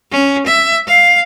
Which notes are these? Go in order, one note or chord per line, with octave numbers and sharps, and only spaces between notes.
C#4
E5
F5